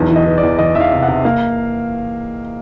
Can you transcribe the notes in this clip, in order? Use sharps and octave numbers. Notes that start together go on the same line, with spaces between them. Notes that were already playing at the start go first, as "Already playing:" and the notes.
Already playing: B1 E2
E3
D#5
E3
D5
E2
E2 D#5
E2 E5
F5
C3
F#5
C3
A#3 F5